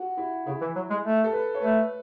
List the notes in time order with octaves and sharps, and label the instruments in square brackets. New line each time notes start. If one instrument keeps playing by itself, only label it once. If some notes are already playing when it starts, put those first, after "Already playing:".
Already playing: [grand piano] F#4
E4
[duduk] C#3 [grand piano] E4
[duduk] E3
F#3
G#3
A3
[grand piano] A4
B4
C#5
[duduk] A3 [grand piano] B4